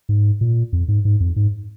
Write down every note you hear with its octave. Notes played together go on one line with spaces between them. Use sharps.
G#2
A#2
F2
G#2
G#2
F2
G#2